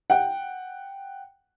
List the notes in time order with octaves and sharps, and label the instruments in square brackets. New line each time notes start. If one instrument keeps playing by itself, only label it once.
[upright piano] F#5 G5